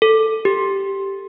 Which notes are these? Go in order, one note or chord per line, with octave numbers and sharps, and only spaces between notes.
A4
G4